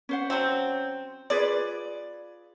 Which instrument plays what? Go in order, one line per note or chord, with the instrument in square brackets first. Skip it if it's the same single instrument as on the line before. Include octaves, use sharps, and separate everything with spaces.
[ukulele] C#4 C5 F#5
[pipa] F#3 C4
[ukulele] F4 G#4 B4 [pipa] D5